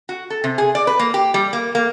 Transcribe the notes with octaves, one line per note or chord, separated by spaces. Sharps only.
F#4
A4
C3
G#4
D5
B4
A#3
G4
G3
A#3
A#3